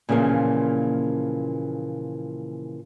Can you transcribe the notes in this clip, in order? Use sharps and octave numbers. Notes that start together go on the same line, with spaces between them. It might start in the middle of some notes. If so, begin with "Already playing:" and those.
A#2 C#3 E3 F3 A#3